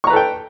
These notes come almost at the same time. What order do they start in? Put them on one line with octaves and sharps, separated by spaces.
C#6 A#5 B4 A4 G5